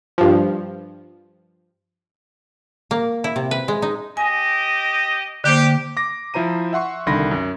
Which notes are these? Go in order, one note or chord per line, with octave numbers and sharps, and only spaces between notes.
G2 F3
A#3
E4
C3
B4
G#3
D#4
G4 D#5 G#5
D3 A#3 G4 C5
D6 A#6
F3 E4 C5 A#5 D#7
E5 F#5 C6 C#6
C2 D3 D#3 B5 C6 A#6
F#2